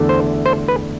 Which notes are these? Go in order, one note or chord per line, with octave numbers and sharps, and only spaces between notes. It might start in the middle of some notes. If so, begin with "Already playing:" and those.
Already playing: E2 D3 A3
C5
C5
B4